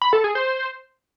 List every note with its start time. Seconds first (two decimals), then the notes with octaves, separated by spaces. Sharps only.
0.02 B5
0.13 A4
0.24 G#4
0.35 C5